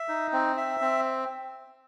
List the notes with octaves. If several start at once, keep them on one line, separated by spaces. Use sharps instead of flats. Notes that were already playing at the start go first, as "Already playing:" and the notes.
Already playing: E5
D#4
C4
E5
C4